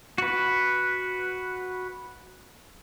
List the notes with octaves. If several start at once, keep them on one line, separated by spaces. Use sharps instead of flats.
F#4 B4